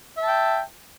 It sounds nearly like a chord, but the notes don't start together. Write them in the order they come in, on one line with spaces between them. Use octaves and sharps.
E5 A5 G5